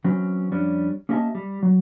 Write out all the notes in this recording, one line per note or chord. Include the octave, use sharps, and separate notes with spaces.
E3 F#3 C4 C#4
F2 G3 C#4 D4
A#3 C#4 G4 D#5 E5 A5
G3
F#3